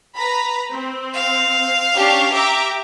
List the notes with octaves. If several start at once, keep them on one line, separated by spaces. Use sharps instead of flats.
B4 A#5 B5
C4
F5
C#4 D4 G4
G4 E5 A#5 D6